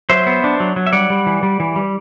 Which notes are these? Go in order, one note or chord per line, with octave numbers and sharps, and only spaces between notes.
F#3 C5 E5
B3
D4
F#3
F#3
E5
G3 D5 F#5
G3
E3
G3
E3
G3